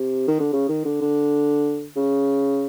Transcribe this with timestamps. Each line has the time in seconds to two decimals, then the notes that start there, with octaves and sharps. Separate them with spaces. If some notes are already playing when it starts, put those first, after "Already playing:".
Already playing: C3
0.28 D#3
0.40 D3
0.53 C#3
0.69 D#3
0.85 D3
1.02 D3
1.97 C#3